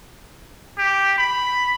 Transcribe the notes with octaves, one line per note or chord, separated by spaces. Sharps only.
G4
B5